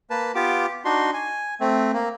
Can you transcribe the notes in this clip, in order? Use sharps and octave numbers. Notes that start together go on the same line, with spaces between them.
A#3 B4 A5
B3 F4 G4 D6
D4 D#4 F#4 C6
G#5
A3 C4
A#3